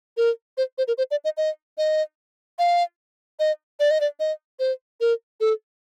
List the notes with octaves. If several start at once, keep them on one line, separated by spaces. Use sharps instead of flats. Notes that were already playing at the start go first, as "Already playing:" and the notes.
A#4
C5
C5
A#4
C5
D5
D#5
D#5
D#5
F5
D#5
D5
D#5
D5
D#5
C5
A#4
A4